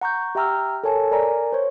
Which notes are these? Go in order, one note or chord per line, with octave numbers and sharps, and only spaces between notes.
F#5 A#5 C#6 G6
G4 E5 G5 A#5 E6 F6
A4 A#4 C#5 G#5 A5
A#4 D5 G#5 A#5
C5 C#5